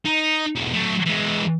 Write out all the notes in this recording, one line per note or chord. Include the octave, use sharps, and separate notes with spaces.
D#4
B1 E2
F#3 A3
E3 G#3